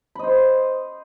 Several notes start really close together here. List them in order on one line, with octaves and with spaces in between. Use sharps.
B5 D#5 C5